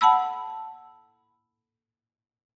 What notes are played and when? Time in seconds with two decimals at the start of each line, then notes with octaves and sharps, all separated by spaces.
0.01 F#5 A5 B5 E6